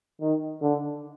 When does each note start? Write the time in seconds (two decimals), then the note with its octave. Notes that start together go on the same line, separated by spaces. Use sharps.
0.21 D#3
0.62 D3